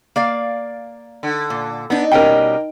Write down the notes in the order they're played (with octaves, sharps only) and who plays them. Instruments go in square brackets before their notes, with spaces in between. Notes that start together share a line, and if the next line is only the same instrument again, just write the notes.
[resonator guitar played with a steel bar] A#3 D5 F5
[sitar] D3
[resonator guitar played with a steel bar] A#2
[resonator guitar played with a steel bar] B3 D4 [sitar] D#4
[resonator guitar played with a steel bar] B2 G3 C#4 [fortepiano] A#4 G5